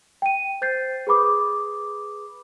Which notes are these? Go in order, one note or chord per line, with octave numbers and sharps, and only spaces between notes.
G5 D#7
C5 G6 A6 C7
G#4 B4 B5 D6 D#6